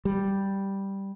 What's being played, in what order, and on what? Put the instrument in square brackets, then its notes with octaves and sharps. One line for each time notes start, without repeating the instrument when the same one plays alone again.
[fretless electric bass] G3